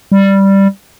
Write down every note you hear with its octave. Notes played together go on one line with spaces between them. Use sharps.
G3